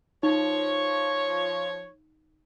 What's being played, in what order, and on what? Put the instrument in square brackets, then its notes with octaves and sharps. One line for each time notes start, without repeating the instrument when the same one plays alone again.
[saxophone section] F3 C#5 [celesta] D#4